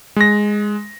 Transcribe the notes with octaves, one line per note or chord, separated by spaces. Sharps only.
G#3 A#6